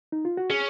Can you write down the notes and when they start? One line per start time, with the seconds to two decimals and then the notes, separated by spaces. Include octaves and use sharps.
0.12 D#4
0.25 F4
0.37 F#4
0.50 C#4 G#4